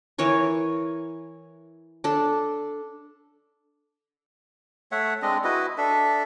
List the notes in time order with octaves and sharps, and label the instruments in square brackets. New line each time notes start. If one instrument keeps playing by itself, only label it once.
[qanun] E3 A#4 C#5 C#6
D4 A4
[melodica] A3 C#5 E5 F#5
G#3 C4 D4 D#5
E4 F#4 B4 D#5
D4 A4 E5